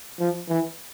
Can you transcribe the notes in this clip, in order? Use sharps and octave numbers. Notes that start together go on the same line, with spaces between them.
F3
E3